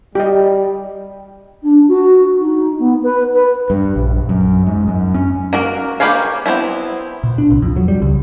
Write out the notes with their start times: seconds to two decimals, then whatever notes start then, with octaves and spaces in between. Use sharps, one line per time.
0.15 G3 G4 D#5
1.63 D4
1.88 F#4
2.41 D#4
2.79 B3
3.03 B4
3.33 B4
3.70 G2
3.96 A#1
4.29 F#2
4.67 G#2
4.88 F#2
5.14 C#4
5.53 A#3 F#4 A#4
6.00 A#3 G4 B4 C#5 F5
6.46 B3 C4 D#4 E4
7.24 A#2
7.38 D4
7.51 C2
7.62 F2
7.76 F#3
7.88 G3
8.02 C#2